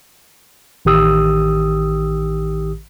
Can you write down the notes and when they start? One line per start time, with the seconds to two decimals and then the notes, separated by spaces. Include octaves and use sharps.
0.85 A1 D#3 G4 D#6 E6